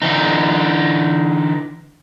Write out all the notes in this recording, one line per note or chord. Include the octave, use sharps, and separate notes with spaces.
D3 E3 D#4